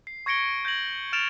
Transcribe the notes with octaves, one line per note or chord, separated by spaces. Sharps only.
C7
C#6 G#6 A#6 C#7 D7 G7
G6 G#6 A#6 F#7
F6 A6 D7 E7 F7